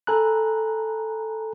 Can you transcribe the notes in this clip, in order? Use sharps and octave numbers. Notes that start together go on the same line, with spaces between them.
A4 G#5 A#5 B5 F#6